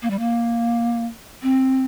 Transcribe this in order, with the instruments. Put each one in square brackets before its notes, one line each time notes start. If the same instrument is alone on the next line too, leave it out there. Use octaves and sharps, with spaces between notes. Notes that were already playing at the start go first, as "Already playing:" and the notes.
[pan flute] A#3
G3
A#3
C4